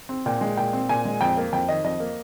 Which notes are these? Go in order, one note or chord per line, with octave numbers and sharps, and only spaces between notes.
C4
A#2 G5
G#3
A#2 G5
C4
A#2 G#5
G#3
F2 G5
A#3
F2 G5
D#3 D#5
F2 D#5
A#3